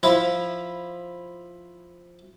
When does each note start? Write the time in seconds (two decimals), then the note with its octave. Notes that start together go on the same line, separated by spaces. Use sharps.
0.03 F3 E4 F4 B5